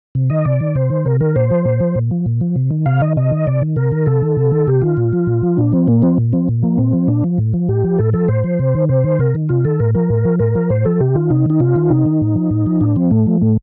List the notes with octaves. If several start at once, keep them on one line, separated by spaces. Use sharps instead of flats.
C3
D#3 D#5
C3 D5
D#3
C3 C5
D#3
C3 A#4
D#3 A#4
A#2 C5
F3
A#2
F3
A#2
F3
A#2
F3
C3
D#3
C3 F5
D#3 D#5
C3 D#5
D#3
C3 D5
D#3
C3 A#4
D#3
C3 A4
D#3
C3
D#3
C3 G4
D#3 F4
A#2
F3
A#2
F3
A#2 D4
F3 C4
A#2 A#3
F3 C4
A#2
F3 C4
A#2
F3 A#3
A#2 C4
F3
A#2 D4
F3
A2
F3
A2 G4
F3
A2 A4
F3 A4
A2 C5
F3
C3
D#3
C3 C5
D#3
C3 A#4
D#3
C3 F4
D#3 A4
A2 A#4
F3 A#4
A2
F3
A2 A#4
F3
A2 C5
F3 A4
C3 G4
D#3 F4
C3 D#4
D#3 D#4
C3 F4
D#3
C3 D#4
D#3
A2
F3
A2
F3
A2 D4
F3 C4
A2 A3
F3
A2 A3